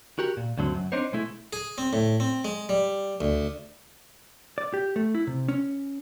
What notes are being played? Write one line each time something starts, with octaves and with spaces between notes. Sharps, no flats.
F#4 G4 A#4
A#2
D2 G2 D3 F#3 C4
F#2
C4 D4 D#4 C5 C#5
B2 G#3 A3 E4
G#4
C4
A2
C4
G#3
G3
D2
D5
G4
A3
E4
C3
C#4